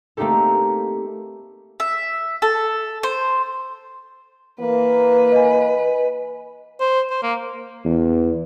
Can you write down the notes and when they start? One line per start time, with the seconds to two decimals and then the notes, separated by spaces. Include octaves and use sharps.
0.17 A3 A#3 C4 D#4 G4 A4
1.80 E5
2.42 A4
3.03 C5
4.60 E3 A#3 B4
5.32 D#5 G#5
6.80 C5
7.10 C5
7.23 A#3
7.85 E2